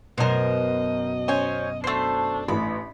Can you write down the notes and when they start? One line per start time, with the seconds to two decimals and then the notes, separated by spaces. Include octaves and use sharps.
0.18 F#2 B2 A#4 C5 D#5
1.28 C#4 C5 C#5 G#5
1.84 A3 D4 C5 C7
2.48 A1 A2 B5